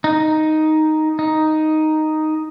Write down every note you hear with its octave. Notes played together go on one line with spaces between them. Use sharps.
D#4
D#4